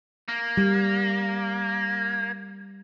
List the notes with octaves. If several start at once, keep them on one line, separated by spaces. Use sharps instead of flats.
A#3
G3